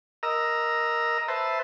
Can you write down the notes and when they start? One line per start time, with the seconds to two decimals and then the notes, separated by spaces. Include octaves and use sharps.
0.23 A#4 D#5 A#5 E6
1.28 B4 C5 E5 A5